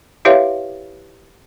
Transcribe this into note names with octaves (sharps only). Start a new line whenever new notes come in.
E4 G4 B4 C#5 E5 F5